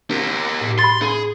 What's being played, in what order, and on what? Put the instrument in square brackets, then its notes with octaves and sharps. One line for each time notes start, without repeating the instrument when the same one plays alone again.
[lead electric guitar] G4 A#4
[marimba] A2
[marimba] B5 A6 [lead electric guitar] C6
[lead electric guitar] G#4